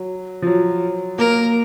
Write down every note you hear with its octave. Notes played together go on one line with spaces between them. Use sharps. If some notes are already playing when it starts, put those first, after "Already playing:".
Already playing: F#3
F3
F#3
A#3 A#4